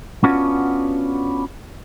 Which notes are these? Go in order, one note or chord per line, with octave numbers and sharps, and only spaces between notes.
B3 C#4 D4 F4 F#4